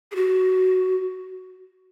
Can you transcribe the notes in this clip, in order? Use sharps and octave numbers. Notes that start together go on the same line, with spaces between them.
G#4
F#4